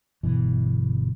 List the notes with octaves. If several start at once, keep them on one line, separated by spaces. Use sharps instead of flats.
G1 B2 E3